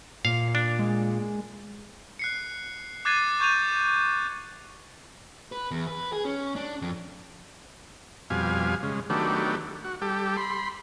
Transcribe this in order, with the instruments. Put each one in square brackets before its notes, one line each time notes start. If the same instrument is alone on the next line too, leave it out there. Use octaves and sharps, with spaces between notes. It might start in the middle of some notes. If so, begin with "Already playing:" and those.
[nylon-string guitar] A#2 [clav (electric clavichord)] F5
[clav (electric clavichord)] D4
[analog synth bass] G#3
[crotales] F#6 C7 C#7
D6 F#6 G#6 A6 C7 D#7
C#6 G6 G#6 D#7 F7
[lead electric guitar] B4
E2
B4
G#4
C#4
D4
F2
[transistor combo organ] F2 B2 G3 F5 G#5
C#3 G#3
D#3 F#3 A3 B3 D4 G4
F#4
G3 G4 A4
B5 C6